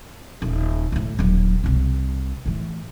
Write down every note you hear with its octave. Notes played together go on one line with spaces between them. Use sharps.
D#1
D2 A2
D#1 F#3
C2 C3
A2 E3